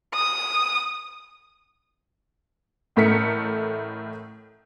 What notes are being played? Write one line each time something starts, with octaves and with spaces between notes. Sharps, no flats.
D#6
A1 A2 A3 A#4 B6 C#7